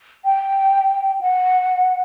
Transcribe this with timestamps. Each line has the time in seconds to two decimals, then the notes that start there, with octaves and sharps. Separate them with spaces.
0.25 G5
1.21 F#5